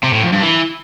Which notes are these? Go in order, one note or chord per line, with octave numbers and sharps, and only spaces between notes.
C3
A2
F2
G2
E3